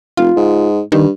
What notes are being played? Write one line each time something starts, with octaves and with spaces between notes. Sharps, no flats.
F1 F4
G#2
G2 D#3